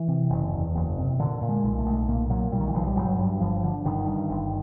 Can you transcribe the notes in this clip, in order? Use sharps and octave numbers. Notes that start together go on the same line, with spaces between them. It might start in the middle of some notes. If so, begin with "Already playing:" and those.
Already playing: E3
C3
F#1
E2
F#1
C3
A#2 D3
A#2
G#3
B1
A3
B1
A#2 A#3
A#2 F#3
B1 G3
D#3
E3
B1 F3
G3
G1 F#3
G2
G1 F3
D3
G1 D#3
G2
G1